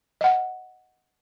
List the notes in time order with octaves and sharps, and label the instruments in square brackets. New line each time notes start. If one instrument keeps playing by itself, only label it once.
[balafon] D#5 F#5